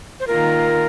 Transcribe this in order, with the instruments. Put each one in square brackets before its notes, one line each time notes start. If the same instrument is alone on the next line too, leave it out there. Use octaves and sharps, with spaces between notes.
[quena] C5
[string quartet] D#3 A#3 F4 [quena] A#4